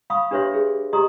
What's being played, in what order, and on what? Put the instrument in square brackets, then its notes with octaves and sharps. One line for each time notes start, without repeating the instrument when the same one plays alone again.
[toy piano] F5 B5 C#6 D#6
D4 G4 B4 C#5 E5 C6
G#4
G4 D#5 A#5 C6 D#6